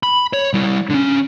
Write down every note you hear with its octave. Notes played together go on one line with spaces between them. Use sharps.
B5
C#5
G3 E4
D3 C#4